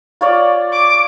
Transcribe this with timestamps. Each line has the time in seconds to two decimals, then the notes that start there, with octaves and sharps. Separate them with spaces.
0.21 F4 C#5 D5
0.73 D6